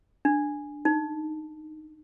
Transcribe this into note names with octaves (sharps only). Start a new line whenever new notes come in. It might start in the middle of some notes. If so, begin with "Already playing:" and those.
D4
D#4